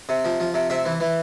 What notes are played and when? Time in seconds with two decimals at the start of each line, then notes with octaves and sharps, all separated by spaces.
0.09 C3
0.25 F3
0.40 F3
0.54 C3
0.70 C3 E5
0.85 E3
1.00 E3